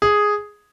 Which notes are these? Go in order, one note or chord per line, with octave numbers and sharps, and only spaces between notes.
G#4